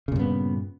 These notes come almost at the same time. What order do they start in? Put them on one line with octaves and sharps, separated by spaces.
C#3 A#2 G2 B3